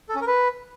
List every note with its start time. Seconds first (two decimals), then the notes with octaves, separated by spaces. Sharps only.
0.09 A4
0.15 C#4
0.21 A#4
0.27 B4